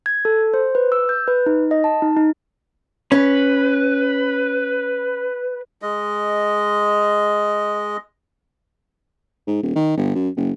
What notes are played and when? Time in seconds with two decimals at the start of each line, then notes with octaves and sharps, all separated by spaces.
0.06 G#6
0.25 A4
0.54 C5
0.75 B4
0.92 E6
1.09 G6
1.28 B4
1.46 D#4
1.71 D#5
1.84 A5
2.02 D#4
2.17 D#4
3.12 C#4 B4
5.82 G#3 D#5
9.47 G#2
9.62 D#1
9.76 D#3
9.97 G1
10.15 F#2
10.37 F#1